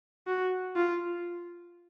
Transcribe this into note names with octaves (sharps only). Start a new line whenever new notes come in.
F#4
F4